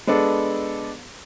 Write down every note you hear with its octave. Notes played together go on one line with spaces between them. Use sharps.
G#3 B3 D4 A4